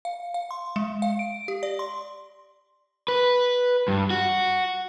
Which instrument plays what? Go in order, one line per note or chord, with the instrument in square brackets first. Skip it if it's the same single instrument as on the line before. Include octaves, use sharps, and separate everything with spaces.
[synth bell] F5
F5
C6
G#3
F5
D7
G4
D5
C6
[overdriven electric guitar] B4
G2
F#4